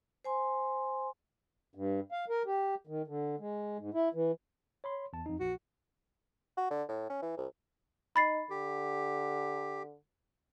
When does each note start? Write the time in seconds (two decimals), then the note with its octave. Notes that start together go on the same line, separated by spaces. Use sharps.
0.24 C5 G#5 C6
1.75 G2
2.12 F5
2.29 A#4
2.46 G4
2.87 D#3
3.07 D3
3.40 G#3
3.78 G#2
3.94 E4
4.14 E3
4.84 C#5 B5 C6
5.13 E2 A5
5.26 F2 D#4
5.40 A#1 F#4
6.57 F#4
6.70 D3
6.89 A2
7.10 C#4
7.22 E3
7.37 C2
8.16 D#4 B5 A6 C7
8.50 D3 G4